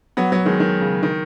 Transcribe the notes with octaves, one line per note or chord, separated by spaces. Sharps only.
F#3 B3
F#3 B3
D#3 G#3
D#3
C#3
D#3